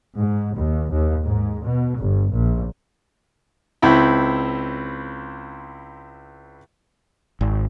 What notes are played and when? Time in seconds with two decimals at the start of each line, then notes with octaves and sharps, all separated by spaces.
0.17 G#2
0.57 D#2
0.92 D#2
1.25 G#2
1.65 B2
1.98 G1
2.33 A#1
3.82 C#2 C4 E4 B5
7.41 G#1